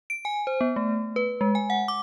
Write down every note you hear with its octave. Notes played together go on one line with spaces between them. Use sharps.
D7
G#5
C5
B3
A3
B4
G#3
G#5
F#5
D6